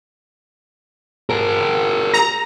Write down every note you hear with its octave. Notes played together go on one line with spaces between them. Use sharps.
G#4 A#4
A#5